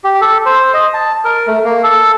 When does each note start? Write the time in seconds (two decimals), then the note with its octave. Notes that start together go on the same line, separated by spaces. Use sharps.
0.04 G4
0.21 A4
0.46 C5
0.74 D#5
0.94 A5
1.25 A#4
1.47 A3
1.64 A#3
1.83 A4